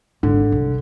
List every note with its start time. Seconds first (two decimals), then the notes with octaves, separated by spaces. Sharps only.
0.23 G#1 D3
0.52 C2